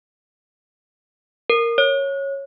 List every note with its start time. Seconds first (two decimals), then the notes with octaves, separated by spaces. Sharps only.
1.50 A#4
1.78 C#5